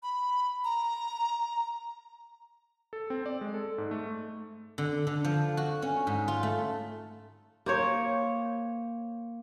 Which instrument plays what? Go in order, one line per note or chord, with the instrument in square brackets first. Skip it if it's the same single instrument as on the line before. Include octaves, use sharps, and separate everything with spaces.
[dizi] B5
A#5
[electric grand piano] A4
C4
D5
G#3
A4
G#2
A3
[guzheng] D3
D3
F3
F#4
C#4
G#2
F4
A3
[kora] A#3 C5 C#5